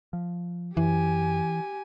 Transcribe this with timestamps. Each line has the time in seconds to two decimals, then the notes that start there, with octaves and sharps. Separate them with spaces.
0.13 F3
0.77 F#2 E3 G4 G#5